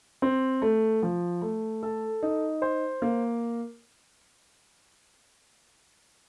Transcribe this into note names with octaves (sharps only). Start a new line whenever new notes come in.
C4
A3
F3
A3
A4
D#4
C5
A#3